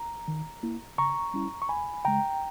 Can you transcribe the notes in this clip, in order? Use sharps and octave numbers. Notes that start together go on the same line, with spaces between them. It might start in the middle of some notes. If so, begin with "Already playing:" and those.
Already playing: A#5
D#3
A#3 E4
C#3 A#5 C#6
G3 C#4 E4
C#6
E2 G#5 B5
C#3 G#3 G5 A#5